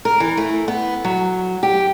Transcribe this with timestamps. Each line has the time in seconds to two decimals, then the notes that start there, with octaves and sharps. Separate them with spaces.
0.05 A#4
0.20 E3
0.37 A3
0.68 B3
1.05 F#3
1.63 G4